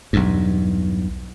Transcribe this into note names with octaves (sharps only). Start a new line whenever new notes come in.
B1 E2 G2